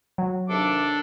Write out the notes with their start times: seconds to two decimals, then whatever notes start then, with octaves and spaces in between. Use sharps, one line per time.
0.18 F#3
0.49 D#2 C3 D4 A4 D6